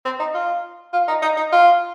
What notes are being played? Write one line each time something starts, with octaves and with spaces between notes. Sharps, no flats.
C4
D#4
F4
F4
D#4
D#4
D#4
F4